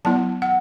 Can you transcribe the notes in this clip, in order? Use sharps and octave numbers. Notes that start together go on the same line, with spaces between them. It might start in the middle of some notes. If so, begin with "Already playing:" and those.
F#3 B3 E4 A5
F#5